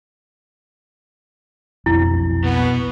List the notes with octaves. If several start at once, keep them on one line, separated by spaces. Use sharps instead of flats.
F1 B1 F2 E4
B2 B3